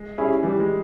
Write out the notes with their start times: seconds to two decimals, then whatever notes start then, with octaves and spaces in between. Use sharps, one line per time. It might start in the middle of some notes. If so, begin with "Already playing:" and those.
Already playing: G#3
0.18 G3 C#4 E4 G#4
0.43 E3 G3
0.60 G#3